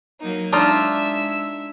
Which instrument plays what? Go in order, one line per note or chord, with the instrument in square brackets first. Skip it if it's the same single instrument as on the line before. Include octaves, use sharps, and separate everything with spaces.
[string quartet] F#3 A#3 D#4
[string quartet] G#3 E5 E6 [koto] D4 D#4 F4